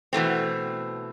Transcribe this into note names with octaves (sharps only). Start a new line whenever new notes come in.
B2 E3 A3 C4